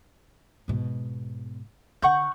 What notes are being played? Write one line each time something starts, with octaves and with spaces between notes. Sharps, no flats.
G#2 B2
D3 F#5 C#6 G6